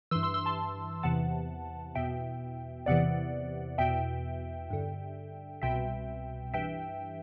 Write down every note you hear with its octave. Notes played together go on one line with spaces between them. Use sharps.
G2 E3 C6 E6
C6 E6
C6 E6
A5 C6
E2 C3 E3 F#5 A5
E2 B2 E5 G5
E2 C3 E3 D5 F#5
E2 B2 E5 G5
G2 D3
C2 B2 E5 G5
G2 E3 E5 G5